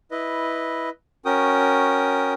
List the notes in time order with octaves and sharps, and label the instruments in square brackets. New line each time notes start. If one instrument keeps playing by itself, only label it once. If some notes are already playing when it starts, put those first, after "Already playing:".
[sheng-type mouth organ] E4 B4 D#5
C#4 F#4 A#4 G5 D#6